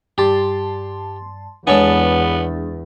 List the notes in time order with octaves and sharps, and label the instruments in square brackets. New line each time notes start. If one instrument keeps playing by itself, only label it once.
[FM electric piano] G2 A5 C6 [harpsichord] G4
[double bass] E2 [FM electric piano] G#3 D4 [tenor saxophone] B3 [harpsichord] A4 C#5 G#5